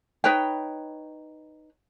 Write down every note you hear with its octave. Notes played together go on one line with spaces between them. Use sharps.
D#4 B4 C#5 G5